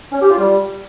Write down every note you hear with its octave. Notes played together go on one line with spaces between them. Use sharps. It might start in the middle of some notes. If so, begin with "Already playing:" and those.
C#4
G4
F4
G3